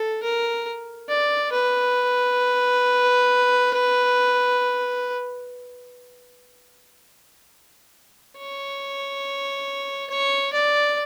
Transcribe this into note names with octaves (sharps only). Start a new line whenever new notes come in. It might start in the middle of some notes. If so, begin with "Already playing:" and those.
Already playing: A4
A#4
D5
B4
C#5
C#5
D5